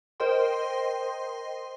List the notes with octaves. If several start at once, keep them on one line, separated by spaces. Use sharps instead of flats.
A#4 C5 D#5 G5 C6